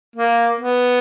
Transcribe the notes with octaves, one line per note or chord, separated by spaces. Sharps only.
A#3
B3